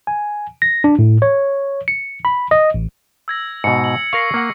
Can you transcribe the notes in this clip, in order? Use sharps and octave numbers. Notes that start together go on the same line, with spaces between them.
G#5
A#6
D4
A2
C#5
C#7
B5
D#5
A1
E6 G#6 A#6
G#2 B2 C#7
F#7
A#4 F5 C#6 A#6 C7
A#3 F#5